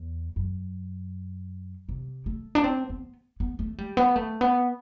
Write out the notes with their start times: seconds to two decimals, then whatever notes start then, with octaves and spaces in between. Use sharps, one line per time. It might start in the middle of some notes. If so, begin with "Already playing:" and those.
Already playing: E2
0.36 F#2
1.89 C3
2.26 A3
2.55 D4
2.64 C4
2.89 B3
3.40 B3
3.59 A3
3.78 G3
3.97 B3
4.16 A3
4.41 B3